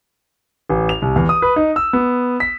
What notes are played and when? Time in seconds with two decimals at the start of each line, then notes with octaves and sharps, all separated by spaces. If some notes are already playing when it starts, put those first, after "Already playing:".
0.70 A1
0.89 F7
1.02 C2
1.16 E2
1.29 D#6
1.42 B4
1.56 D#4
1.76 E6
1.93 B3
2.40 B6